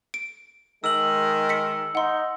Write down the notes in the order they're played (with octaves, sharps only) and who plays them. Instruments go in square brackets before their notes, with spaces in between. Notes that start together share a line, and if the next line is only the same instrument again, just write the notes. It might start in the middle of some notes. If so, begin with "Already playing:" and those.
[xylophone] D7
[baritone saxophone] D#3 [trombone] G#3 [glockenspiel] E6 F#7
[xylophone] B6 C#7
[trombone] D#4 [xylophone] F#5 C6